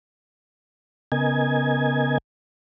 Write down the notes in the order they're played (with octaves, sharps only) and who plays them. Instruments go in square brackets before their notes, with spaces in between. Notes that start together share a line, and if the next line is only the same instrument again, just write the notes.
[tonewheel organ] C#3 B3 A#4 D#5 G#5 G#6